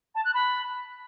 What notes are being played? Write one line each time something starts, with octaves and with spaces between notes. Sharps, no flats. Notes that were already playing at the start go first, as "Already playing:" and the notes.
A5
F#6
B5